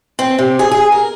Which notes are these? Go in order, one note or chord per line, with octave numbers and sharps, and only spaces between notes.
C4
C3
G#4
G#4
A#4